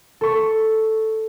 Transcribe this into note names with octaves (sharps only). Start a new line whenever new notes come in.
A4 C#6